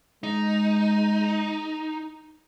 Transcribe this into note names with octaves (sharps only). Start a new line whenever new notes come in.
G#3 D#4